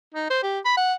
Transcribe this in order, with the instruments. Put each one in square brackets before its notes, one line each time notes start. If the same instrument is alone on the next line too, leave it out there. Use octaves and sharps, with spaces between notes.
[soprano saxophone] D#4
C5
G4
B5
F#5